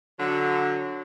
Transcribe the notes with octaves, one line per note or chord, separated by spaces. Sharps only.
D3 F#3